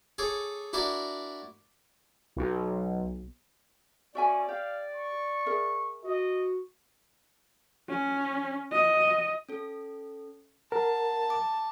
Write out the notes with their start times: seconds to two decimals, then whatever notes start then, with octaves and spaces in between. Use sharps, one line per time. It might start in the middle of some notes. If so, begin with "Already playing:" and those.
0.18 G#4 A4 C#5 D6
0.73 D4 E4 F#4 A#4 D5
2.36 B1
4.15 C#4 F#4 D5 E5 G#5
4.49 G4 F5
4.94 C#6
5.46 G#4 A#4 E5
6.04 F#4 D#5
7.89 C#4
8.72 D#5
9.49 C#4 A4
10.72 A#4 F#5 A5
11.30 D6